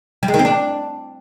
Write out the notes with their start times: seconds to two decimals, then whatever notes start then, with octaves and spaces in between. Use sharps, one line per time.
0.23 G3
0.28 G#3
0.34 D#3
0.39 C4
0.45 D4